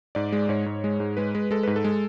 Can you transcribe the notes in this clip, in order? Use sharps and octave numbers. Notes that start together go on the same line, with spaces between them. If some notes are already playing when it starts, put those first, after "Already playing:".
G#2 D5
G#3
G#2 C#5
G#2
G#3
G#2
G#3 B4
G#3
G#3 A4
G#2 B4
A4
G#3